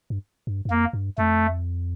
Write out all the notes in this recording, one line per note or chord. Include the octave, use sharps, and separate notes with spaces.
G2
G2
G2
F2 A#3
G2
F2 A3